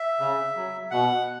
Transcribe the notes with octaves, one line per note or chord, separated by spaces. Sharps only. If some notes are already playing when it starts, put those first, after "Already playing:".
Already playing: E5
C#3
F#3
B2 F#5